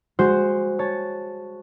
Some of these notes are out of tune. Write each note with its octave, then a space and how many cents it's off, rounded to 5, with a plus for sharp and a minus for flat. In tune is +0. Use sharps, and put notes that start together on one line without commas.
G#3 -20 F#4 +0 C5 +0
C#5 +0 A5 +0